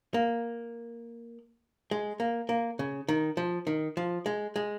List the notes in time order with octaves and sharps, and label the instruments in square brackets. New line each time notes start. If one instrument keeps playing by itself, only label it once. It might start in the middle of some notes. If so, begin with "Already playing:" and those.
[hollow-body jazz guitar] A#3
G#3
A#3
A#3
C#3
D#3
F3
D#3
F3
G#3
G#3